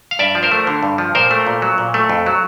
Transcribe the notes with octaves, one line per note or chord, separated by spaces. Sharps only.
F5
G2 D5 E5
F3
A#4 C5
A3
D3
G2
F3
A#2 A#4 C5
A3
A#2
F#3
A#2
A3
F2
F#3